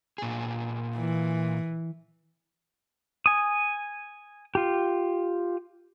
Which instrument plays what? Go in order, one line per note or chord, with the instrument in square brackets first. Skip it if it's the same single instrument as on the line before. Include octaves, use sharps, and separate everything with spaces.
[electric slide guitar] A#2 G#4
[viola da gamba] E3
[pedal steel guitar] G#5 D#6
F4 G4